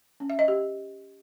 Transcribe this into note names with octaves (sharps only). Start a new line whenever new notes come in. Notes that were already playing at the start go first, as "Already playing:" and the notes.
C#4
E5
D#5
G4